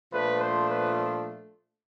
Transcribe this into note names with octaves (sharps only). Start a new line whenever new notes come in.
A#2 F3 A3 D4 B4
C5
B4